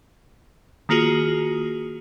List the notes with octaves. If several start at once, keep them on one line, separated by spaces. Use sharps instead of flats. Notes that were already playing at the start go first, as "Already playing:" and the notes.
D#3 A#3 F4 F#4 G#4